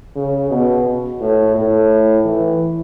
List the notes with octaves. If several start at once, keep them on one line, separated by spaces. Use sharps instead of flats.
C#3
B2
A2
A2
E3